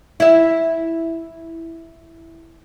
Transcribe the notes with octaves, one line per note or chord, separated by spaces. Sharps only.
E4 E5